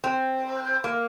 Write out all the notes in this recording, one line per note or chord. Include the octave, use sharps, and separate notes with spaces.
C4
A#3